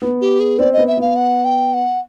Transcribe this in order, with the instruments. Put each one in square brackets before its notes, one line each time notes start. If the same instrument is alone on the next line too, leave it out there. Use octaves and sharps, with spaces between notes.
[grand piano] B3
[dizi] G4
G#4
[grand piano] C4 [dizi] D5
[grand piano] B3 [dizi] D#5
[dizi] E5
[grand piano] B3 [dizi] F5
[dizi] F#5
G5
F#5